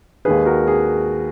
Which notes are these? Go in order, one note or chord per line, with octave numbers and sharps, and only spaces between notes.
D#2 D#3 G#3 G#4 B4
F#4 A#4
G#4